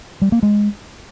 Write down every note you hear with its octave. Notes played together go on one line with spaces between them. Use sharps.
G3
A#3
G#3